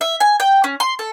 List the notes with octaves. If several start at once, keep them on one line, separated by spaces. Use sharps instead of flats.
E5
G#5
G5
C#4
C6
A4